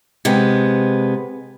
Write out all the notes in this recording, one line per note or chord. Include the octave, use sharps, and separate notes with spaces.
C3 G#3 B3